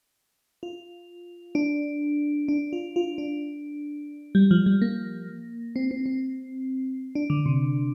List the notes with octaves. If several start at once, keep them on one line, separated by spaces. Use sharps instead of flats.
F4
D4
D4
F4
F4
D4
G3
F3
G3
A#3
C4
C4
C4
D4
D3
C3